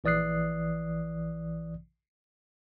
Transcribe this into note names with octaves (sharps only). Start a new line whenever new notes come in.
A#1 E3 D5 D#6 F#6 C7